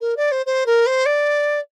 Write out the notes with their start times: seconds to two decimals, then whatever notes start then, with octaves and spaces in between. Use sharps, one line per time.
0.01 A#4
0.17 D5
0.32 C5
0.46 C5
0.66 A#4
0.86 C5
1.06 D5